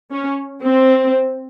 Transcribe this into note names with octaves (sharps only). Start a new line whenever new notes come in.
C#4
C4